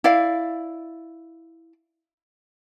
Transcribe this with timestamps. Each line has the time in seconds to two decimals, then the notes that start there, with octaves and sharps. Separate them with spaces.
0.04 E4 D5 F5